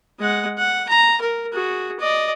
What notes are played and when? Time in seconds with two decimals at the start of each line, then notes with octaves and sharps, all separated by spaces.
0.19 G#3 F#5
0.58 F#5
0.89 A#5
1.21 A#4
1.53 F#4 G#4
2.00 D5 D#5